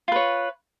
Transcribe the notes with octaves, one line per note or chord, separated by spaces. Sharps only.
F4 B4 C#5